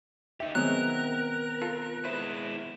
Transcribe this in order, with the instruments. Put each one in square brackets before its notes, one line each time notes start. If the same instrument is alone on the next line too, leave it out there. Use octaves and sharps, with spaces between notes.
[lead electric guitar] D#4 G4 [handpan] E5
[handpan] D#3 B3 C4 [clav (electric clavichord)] F#3 G#3 [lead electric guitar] A#4 [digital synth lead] F#6
[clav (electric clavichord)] F4 A4
[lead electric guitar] G#3 E4 [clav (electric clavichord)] B4 C5